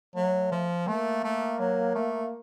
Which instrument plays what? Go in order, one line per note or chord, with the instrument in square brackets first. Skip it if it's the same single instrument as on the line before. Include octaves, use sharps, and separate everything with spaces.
[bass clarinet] F#3 [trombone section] A3
[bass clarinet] F3
[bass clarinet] A3 [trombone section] A#3
[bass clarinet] A3
F#3
A3